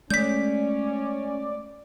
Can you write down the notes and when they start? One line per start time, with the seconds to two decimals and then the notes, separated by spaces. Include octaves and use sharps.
0.10 G#3 A3 C#4 D5 G6 B6